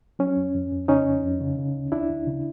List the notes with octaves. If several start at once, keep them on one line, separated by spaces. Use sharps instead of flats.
F#3 C#4
F2
F2
F2
C#3 C#4 D#4
F2
F2
C#3
C#3
D2
D2 D4 E4
D2
C#3